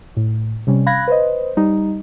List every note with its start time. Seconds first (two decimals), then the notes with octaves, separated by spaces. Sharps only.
0.17 A2
0.67 C3 G3 C#4
0.86 F5 B5 F#6 G#6 A#6
1.07 B4 C5 D#5
1.57 G3 D#4